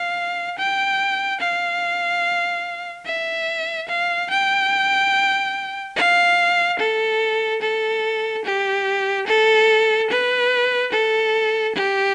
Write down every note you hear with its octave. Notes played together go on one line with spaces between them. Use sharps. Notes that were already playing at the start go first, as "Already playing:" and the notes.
Already playing: F5
G5
F5
E5
F5
G5
F5
A4
A4
G4
A4
B4
A4
G4